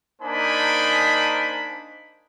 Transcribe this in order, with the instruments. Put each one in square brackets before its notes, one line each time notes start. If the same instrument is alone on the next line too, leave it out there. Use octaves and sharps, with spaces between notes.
[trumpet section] A#3 D4 D#4 C5 G#5 B5